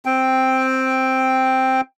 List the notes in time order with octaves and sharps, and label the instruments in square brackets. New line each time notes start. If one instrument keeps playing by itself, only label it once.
[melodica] C4 G5